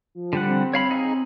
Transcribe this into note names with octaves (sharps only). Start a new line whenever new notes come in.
F3
D3 G3 F#5
C4
C#5 F5 B5
D#4 G#4